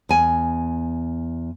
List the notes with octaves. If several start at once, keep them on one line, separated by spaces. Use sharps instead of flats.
E2 G#5